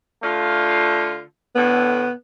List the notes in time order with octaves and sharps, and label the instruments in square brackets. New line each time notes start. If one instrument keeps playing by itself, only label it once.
[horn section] D3 A3 F4
[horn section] A2 D3 [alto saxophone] B3